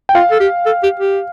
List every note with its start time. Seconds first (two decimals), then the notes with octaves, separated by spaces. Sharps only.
0.09 G5
0.15 F4 F5
0.31 A4
0.40 G4
0.66 A4
0.83 G4
1.00 G4